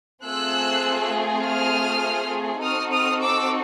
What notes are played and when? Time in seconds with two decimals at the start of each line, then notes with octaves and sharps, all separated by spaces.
0.24 A3 C4 F4 G#4 E6 F#6
1.43 D#6 F6
2.62 C4 D#4 F#4 A4 D#6 F6
2.91 D#6 F6
3.22 D6 E6